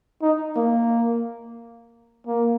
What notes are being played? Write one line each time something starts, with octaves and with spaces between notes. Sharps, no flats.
D#4
A#3
A#3